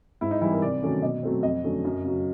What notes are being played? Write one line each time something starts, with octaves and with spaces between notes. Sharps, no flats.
G#2 E4
D#4
E3 G3 E4
A#4
C3 D5
D#3 F#3 A3 C#4
B2 D#5
F#3 A3 C4
F2 D#5
D3 F#3 A3 C#4
F#2
C#3 F#3